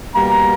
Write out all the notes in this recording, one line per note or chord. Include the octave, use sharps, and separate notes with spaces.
B2 G3 A#3 A#5